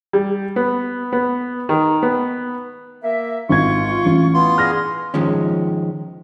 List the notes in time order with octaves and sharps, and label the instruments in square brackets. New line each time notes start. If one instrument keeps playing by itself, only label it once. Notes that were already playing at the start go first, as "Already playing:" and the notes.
[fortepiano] G3
B3
B3
D#3
B3
[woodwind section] A#3 E5
[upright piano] G#1 G#6 [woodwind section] F4 C#6
[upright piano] A1
[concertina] B3 F4 C6
[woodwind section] D4 G#4 [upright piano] F6 A#6
[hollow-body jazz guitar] D#3 F3 G#3 C#4